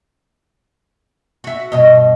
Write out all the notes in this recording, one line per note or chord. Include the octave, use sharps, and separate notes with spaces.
F#4 E5
G2 B2 D#5